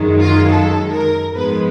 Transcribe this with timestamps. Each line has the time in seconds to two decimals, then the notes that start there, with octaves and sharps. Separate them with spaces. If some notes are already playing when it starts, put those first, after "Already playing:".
Already playing: F#2 D#3 G#3
0.20 F4
0.48 A4
0.91 A#4
1.33 G#2 F3 G#3 B3 B4